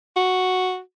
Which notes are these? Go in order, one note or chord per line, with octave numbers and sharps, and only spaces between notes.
F#4